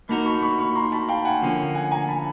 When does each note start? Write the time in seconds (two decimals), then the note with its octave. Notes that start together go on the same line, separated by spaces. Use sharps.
0.09 A#3 D#4 F#4 A#4 A5 B5
0.25 B5 C#6
0.42 B5 C#6
0.59 B5 C#6
0.75 A#5 C6
0.92 A5 B5
1.08 F5 G5
1.25 F#5 G#5
1.42 D3 F3 A#3 C#4
1.75 F#5 G#5
1.91 G#5 A#5
2.08 A5 B5